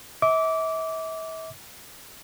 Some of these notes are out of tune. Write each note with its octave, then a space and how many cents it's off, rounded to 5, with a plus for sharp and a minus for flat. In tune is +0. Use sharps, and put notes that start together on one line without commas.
E5 -40 D6 -20